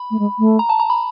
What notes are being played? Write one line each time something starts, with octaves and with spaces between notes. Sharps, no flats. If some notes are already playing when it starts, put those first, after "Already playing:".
Already playing: B5
A3
G#3
A3
A#5
A5
A#5
B5